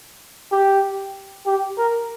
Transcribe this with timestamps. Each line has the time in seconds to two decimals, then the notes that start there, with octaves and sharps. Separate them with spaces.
0.51 G4
1.46 G4
1.78 A#4